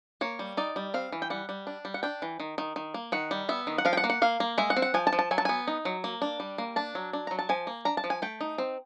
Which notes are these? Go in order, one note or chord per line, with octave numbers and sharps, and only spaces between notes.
A#3 C#5
G3
D#4 D5
G3
C4 F5
E3
G5
G3 F#5
G3
D4
G3
F#5
D4 G5
E3
D#3
D#3
D#3
A#3
D#3 F#5
G3
B3 E5
D#3
F#5
F3 F5
G5
F#5
A#3
F#5
A#3 F5
A#3
G#3 E5
F#5
C4
F#5
F3 G#5
A5
F3
A5
F#3 G#5
A5
B3 G#5
D#4
F#3
A#3
D4
G3
A#3
D4 A5
F#3
D4
F#3 A#5
A5
F3 G#5
A#3
D4 A#5
A5
F3
G#5
A3 G5
D#4
C4